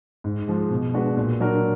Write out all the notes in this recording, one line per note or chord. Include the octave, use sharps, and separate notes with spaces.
G#2
F3 G#3
B2
G#3 D4 F#4 B4
A#2
F#3 D4 F#4 A#4